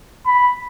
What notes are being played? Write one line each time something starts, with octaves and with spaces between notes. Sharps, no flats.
B5